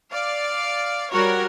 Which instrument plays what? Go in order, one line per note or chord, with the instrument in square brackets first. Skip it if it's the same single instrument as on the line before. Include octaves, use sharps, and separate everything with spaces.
[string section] D5 F5
G3 F#4 A#4 C#5